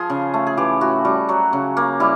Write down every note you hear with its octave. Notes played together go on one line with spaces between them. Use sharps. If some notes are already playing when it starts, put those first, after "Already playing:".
Already playing: F3 G#4
C#3
A3
G#4
E3 G4
A2 F#4
G3 F#4
F#3 F#4
C#3
A#3
G3 E4